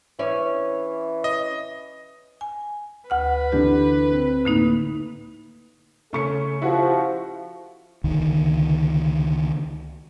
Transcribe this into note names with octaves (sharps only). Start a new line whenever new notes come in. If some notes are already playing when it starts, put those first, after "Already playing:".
E3 C#4 C#5 D5
D#5
G#5
D2 B4 F#5 F6
D3 E3 D4 G4
C4
A2 D3 A#3 D#4
C#3 A3 C#4 A4 C#6 C#7
F3 E4 F#4 G4
C#2 D3 D#3